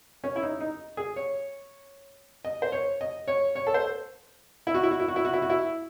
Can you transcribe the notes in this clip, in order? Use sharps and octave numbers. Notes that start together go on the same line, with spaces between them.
C#4
E4
D#4
D#4
G#4
C#5
D#5
C5
C#5
D#5
C#5
C#5
A4
C5
E4
F#4
E4
F#4
E4
F#4
E4
F#4
E4
F#4
E4